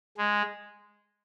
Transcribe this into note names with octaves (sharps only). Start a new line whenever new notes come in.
G#3